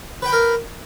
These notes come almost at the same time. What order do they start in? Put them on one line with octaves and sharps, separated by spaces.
B4 G5 B5 A#4